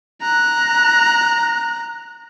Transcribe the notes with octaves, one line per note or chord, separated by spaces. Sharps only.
A#5 F#6